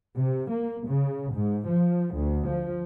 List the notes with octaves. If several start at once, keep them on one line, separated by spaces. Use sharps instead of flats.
C3
A#3
C#3
G#2
F3
D2
F3